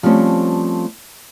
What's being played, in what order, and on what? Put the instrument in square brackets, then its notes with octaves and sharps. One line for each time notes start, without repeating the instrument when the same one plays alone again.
[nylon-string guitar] F3 G3 A3 C4 C#4